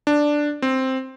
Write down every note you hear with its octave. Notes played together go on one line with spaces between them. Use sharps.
D4
C4